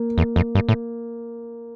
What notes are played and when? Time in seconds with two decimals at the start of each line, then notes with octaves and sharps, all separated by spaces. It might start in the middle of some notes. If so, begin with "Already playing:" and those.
Already playing: A#3
0.18 E2
0.36 F2
0.55 G2
0.69 A2